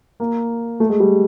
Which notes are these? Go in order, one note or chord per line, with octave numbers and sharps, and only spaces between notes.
A#3
A3
G#3
G3